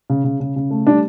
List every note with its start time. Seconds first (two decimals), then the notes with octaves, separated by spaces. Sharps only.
0.10 C#3
0.24 C#3
0.40 C#3
0.56 C#3
0.71 A3
0.87 G3 D4